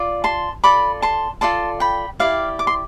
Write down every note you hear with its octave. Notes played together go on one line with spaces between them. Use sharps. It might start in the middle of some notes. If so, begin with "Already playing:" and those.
Already playing: F4 D5
A5 C6
F4 A4 D5 B5 D6
A5 C6
F4 A4 D5 A5 C6
G5 B5
E4 G4 D5 F5
D6
C6